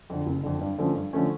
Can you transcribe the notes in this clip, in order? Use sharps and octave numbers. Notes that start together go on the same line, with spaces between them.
F2 D3
F#1
F2 D3
G2
D3 F3 A3 C#4
G2
D3 F3 A3 C#4